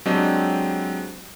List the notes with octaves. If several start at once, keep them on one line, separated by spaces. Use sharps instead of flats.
F#3 G#3 C4 D4 G4 D#5